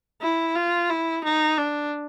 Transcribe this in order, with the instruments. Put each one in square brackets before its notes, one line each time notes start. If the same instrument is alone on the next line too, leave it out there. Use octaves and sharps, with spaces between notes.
[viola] E4
F4
E4
D#4
D4